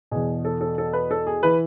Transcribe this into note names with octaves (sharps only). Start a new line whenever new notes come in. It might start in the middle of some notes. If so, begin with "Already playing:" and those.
E2 B2 G#4
A4
A4
A4
B4
A4
G#4
E3 B4